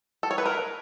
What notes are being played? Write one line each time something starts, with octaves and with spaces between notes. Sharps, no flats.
A4
C#5
B4
A#4